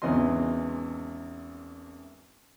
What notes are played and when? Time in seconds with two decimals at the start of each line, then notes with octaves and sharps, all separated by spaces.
0.02 G#1 E2 C#3 E3 D#5 C6